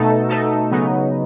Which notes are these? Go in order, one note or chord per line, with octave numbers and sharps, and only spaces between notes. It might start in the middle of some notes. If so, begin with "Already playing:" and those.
Already playing: B2 A3 D#4 A4
B2 A3 D#4 A4
C#3 F#3 B3 D#4